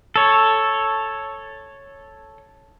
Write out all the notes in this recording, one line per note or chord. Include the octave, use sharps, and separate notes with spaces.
A4 C#5